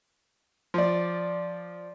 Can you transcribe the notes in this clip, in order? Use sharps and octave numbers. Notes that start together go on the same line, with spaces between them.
F3 D5